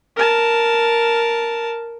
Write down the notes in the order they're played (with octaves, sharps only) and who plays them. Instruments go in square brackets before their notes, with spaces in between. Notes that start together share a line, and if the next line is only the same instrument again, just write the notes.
[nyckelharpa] A#4 A5